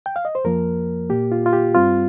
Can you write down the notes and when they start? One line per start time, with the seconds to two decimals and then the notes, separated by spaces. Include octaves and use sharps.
0.06 G5
0.16 F5
0.25 D#5
0.35 C5
0.44 F2 F3 A#3 A#4
1.10 A#2 A#3 G4
1.32 F4
1.46 F4
1.53 G4
1.74 G2 G3 C4 F4